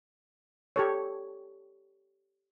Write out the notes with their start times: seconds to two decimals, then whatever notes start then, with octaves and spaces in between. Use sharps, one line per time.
0.76 G4 A4 C#5